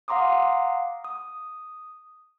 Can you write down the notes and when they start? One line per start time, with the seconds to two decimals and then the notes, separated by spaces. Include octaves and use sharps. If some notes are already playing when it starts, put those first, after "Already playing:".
0.08 F5 F#5 A#5 C6 D6 D#6
1.05 D#6